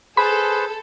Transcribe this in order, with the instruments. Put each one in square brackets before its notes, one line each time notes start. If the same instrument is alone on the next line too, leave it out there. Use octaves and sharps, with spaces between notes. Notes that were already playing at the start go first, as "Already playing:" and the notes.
[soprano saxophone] G#4 [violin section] A4 [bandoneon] B4 C5 [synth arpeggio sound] B5